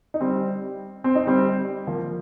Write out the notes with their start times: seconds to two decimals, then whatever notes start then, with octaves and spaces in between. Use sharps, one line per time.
0.14 D#4
0.21 G3 C4
1.04 C4
1.15 D#4
1.27 G3 C4
1.87 F3 A#3